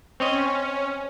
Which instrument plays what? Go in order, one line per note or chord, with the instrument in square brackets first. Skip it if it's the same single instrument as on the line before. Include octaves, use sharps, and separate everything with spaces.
[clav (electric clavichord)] C4 C#5 D#5 [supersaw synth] C#4